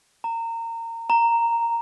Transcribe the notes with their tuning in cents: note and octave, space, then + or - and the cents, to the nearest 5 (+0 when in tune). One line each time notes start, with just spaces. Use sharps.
A#5 -25
A#5 -5